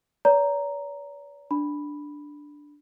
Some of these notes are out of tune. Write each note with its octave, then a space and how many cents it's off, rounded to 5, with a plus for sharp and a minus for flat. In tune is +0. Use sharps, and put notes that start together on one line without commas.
B4 +25 D5 -45 A#5 +0
D4 +0 B5 +0